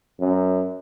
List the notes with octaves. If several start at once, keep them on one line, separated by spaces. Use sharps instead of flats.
F#2